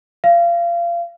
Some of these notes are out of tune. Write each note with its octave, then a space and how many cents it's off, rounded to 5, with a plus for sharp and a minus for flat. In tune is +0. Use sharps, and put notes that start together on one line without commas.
F5 -30